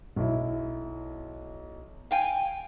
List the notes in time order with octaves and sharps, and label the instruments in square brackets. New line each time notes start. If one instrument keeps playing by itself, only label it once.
[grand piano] B1 E4
[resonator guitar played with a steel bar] F5 G5 G#5